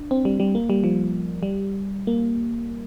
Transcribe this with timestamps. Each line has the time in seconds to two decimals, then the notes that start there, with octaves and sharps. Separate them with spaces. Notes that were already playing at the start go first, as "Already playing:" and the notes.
Already playing: D4
0.11 C4
0.25 G3
0.40 G3
0.55 A#3
0.70 G3
0.84 F3
1.43 G3
2.07 A#3